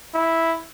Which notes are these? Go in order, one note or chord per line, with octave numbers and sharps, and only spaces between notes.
E4